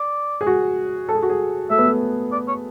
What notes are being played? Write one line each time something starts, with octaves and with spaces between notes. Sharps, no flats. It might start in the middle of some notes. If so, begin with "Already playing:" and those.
Already playing: D5
G#4
F#4
A4
G#4
F#4
G#4
A3 E5
B3
A3
D5
C#5